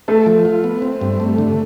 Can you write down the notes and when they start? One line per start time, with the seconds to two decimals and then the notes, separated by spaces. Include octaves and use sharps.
0.08 A3 A4
0.26 F3
0.45 F4
0.64 B3
0.82 C4
1.01 G2
1.20 A3
1.38 D3